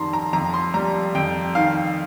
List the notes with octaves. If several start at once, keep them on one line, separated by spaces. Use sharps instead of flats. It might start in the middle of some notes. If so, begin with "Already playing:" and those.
Already playing: F2 D#3 G3 A5 A#5 C6
A#5
F2 A#5
C6
G3 A#5
F2 G5
D#3 F5